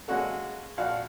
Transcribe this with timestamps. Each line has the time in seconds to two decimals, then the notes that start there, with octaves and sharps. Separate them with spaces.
0.08 G#3 A#3 C#4 F#4 A4
0.77 A#1 F#4 F5